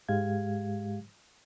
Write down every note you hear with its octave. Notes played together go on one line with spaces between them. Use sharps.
G#2 G#3 G4 F5 G#6